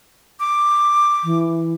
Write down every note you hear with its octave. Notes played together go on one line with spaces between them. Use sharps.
D6
E3